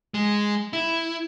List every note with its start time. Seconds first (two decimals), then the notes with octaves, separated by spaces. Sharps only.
0.14 G#3
0.73 E4